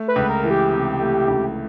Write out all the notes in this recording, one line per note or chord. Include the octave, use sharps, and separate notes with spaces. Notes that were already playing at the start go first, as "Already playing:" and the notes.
Already playing: A3
B4
C#2
A#4
E3
G4
C3
A3
C#2